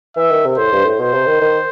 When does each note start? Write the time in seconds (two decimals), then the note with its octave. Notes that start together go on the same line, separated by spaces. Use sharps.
0.17 E3 E5
0.31 D#3
0.45 C3
0.58 A2 C5
0.72 G2
0.85 A2
0.99 B2 C5
1.13 C3
1.26 D#3
1.41 D#3